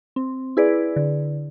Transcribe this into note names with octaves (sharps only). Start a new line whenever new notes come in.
C4
E4 G#4 B4 D5
D3